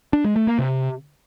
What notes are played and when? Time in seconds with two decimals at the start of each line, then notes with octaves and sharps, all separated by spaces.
0.13 D4
0.24 G#3
0.36 A3
0.47 A#3
0.59 C3